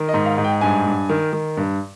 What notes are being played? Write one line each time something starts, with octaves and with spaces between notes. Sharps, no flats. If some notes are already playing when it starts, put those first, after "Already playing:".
Already playing: D#3
D#5
G#2
F5
G#2
G5
G2 G#5
G2
D#3
D#3
G2